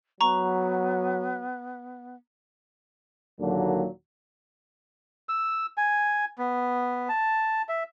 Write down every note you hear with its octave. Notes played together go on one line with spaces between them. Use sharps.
F#3 B3 A#5 C#6
D#2 A#2 D3 F#3
E6
G#5
B3
A5
E5